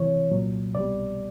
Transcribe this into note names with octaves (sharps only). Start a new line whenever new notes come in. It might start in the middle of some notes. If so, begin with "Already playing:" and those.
Already playing: C#2 C3 E3 C#5
C2 A#2 F#3
C2 B2 G3 D5